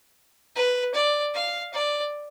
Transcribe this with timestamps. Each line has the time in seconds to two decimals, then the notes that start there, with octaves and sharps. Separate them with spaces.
0.55 B4
0.94 D5
1.34 F5
1.74 D5